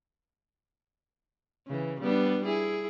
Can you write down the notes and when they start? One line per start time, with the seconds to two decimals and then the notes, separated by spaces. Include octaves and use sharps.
1.67 C#3 E3
2.01 G3 B3 D4
2.45 E4 G#4